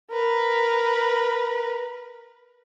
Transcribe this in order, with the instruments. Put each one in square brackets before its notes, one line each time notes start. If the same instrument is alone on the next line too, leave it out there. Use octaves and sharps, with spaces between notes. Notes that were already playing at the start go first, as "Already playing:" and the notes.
[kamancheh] A#4 B4